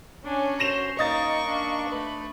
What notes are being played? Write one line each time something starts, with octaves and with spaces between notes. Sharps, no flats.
C#4 D4 C#5 G#5
F#4 C5 C6 A#6 E7 F7
A#3 D#4 D#5 F5 C#6 D#6 A6
D4
A3 B4